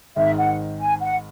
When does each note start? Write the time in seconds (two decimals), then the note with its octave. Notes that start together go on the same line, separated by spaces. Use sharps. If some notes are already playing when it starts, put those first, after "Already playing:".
0.16 G#1 G#2 D#3 E5
0.37 F#5
0.79 G#5
1.00 F#5